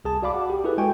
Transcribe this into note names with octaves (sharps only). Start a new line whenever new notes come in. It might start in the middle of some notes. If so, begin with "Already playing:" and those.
C2 G#4 A5
F#4 D5 F5 B5 D6
F#5
G4
E4 F#4 G#4 A4 B4
G#3 G5 G#5 C#6